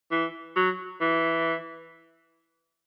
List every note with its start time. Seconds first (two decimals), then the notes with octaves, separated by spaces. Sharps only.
0.12 E3
0.56 F#3
1.01 E3